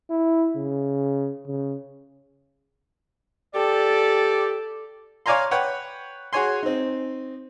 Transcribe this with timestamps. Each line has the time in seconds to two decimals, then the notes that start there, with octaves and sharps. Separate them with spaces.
0.10 E4
0.56 C#3
1.47 C#3
3.55 G4 A4 D5
5.26 C#5 D5 F5 G#5 A#5 C6
5.51 B4 C#5 F#5 G5
6.33 F#4 G#4 C#5 G#5 C6
6.63 C4 D#4